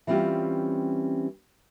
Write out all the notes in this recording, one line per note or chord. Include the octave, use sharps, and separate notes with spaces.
E3 G3 C4 C#4 F4 G4